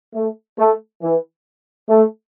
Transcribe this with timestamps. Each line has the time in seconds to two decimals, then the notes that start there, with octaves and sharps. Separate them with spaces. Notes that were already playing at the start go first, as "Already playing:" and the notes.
0.14 A3
0.58 A3
1.01 E3
1.88 A3